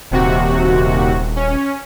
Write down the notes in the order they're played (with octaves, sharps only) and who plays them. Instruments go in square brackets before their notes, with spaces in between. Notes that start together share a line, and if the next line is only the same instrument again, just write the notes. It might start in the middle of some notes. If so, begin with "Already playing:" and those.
[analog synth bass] D#1 [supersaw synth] D#2 C3 F#4
[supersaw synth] C#4